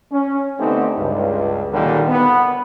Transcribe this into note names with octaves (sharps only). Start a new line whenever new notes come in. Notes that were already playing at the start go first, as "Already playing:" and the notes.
C#4
D3 A3 B3 C4 D#4 G4
C#2 G2
A#2 D3 D#3 F#3 G3 A#3
B3